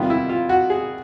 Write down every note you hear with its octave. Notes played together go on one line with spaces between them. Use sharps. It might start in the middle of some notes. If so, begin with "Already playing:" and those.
Already playing: C3 D#3 G3 B3 F4
E4
F4
F#4
G#4